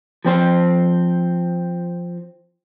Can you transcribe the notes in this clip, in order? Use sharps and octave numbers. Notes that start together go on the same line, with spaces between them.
F3 C4 C5